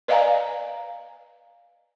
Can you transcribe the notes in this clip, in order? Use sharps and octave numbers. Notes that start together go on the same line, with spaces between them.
B4 D5 D#5 F5 G#5 A#5